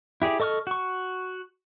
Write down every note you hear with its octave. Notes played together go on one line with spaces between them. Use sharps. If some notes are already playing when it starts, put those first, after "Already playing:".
E4 G4 G#4 D5
A4 D#5 C#6 D6 F6
F#4 C#6